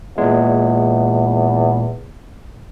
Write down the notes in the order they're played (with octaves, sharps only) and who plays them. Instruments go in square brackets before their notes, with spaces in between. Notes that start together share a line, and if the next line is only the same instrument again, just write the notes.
[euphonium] E2 [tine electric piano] A#2 G#3